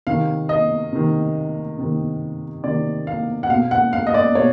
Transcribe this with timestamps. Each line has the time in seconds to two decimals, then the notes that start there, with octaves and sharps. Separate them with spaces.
0.07 C3 D#3 F5
0.49 D#5
0.93 C3 D#3
1.78 C3 D#3
2.64 C3 D#3 D5
3.07 F5
3.43 F#5
3.50 B2 F5
3.71 F#5
3.93 F5
4.07 D#5
4.14 D5
4.35 B2 C#5